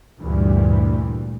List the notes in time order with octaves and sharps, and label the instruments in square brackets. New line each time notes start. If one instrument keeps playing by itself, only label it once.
[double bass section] D2 G2 A#2 E3 G3